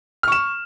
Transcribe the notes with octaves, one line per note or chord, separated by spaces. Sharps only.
C#6 F6 E7